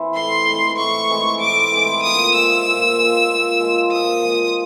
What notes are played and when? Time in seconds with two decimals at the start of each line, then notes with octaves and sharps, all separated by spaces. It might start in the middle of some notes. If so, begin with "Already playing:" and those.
Already playing: E3 C4
0.15 A2 C6
0.47 E3 G#3 C4
0.78 A2 C#6
1.10 E3 G#3 C4
1.41 A2 D6
1.72 E3 G#3 C4
2.03 A#2 D#6
2.35 F3 G#3 E6
2.66 A#2
2.97 F3 G#3
3.29 A#2
3.60 F3 G#3
3.91 A#2 D#6
4.22 F3 G#3